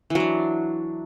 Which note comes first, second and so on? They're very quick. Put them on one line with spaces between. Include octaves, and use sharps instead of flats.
E3 F#3 D4